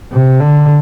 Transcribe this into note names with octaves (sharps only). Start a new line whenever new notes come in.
C3
D3